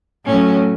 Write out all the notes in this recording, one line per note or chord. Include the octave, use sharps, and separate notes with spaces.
A2 F#3 C#4